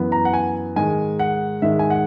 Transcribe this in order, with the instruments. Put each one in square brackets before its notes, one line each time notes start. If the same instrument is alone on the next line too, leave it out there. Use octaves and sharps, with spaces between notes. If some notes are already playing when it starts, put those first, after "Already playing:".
Already playing: [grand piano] F#2 E3 B3
A#5
F#5
G#5
G#2 D#3 G#3 G#5
F#5
G#2 D#3 G#3 E5
G#5
F#5